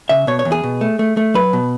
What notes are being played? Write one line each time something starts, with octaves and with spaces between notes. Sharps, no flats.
C#3 E5
B2 C#5
C#5
E2
G#4
B2
A3
A3
A3
F#3 B4
B2